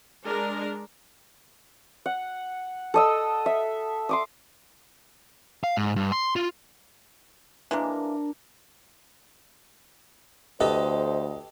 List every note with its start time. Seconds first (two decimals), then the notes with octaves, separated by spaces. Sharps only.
0.23 G#3 D4 A#4
2.06 F#5
2.94 A4 D#5 E6
3.46 E5
4.09 C6 D6 D#6
5.64 F5
5.77 G#2
5.96 G2
6.12 C6
6.36 F4
7.71 E3 G#3 A#3 D4 A#4
10.60 D2 G4 A4 B4 C5 D#5